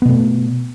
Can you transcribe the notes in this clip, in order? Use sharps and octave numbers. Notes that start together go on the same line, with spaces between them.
B2 A3 B3